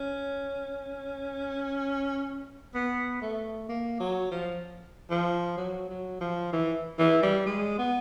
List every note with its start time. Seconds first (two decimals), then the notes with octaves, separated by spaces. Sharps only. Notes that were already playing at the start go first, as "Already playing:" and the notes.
Already playing: C#4
2.75 B3
3.22 A3
3.69 A#3
4.00 F#3
4.32 F3
5.11 F3
5.58 F#3
5.89 F#3
6.21 F3
6.53 E3
6.99 E3
7.23 G3
7.47 G#3
7.79 B3